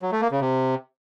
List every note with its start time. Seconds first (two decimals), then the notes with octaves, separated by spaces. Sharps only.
0.02 F#3
0.12 A3
0.21 A#3
0.31 C#3
0.41 C3